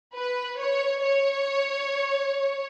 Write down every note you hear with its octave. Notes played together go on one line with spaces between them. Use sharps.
B4
C#5
C#5